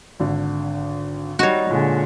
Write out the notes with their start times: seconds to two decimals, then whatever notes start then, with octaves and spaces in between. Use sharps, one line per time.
0.20 G#1 D3
1.39 G3 D#4 F#4 C#5
1.71 A#2 D3 G#3